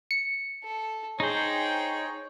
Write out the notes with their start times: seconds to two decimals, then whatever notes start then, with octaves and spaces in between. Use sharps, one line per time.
0.11 C#7
0.64 A4
1.20 D#4 G#4 C5 C#5 G5